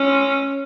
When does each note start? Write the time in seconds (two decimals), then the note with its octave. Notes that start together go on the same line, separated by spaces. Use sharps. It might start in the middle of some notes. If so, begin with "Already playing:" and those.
Already playing: C#4